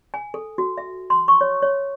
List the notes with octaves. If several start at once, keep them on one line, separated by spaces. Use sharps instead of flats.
G#5
A4
F#4
E5
C6
C#6
C#5
C#5